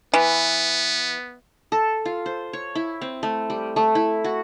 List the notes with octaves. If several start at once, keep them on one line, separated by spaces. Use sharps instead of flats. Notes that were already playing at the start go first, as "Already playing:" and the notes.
E3 B3
A4
F4
C5
C#5
E4
C4
A3
G3
A3
E4
F#4